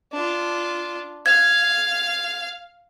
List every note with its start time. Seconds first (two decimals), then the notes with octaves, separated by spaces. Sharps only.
0.13 D4 F4
1.26 F5 G#6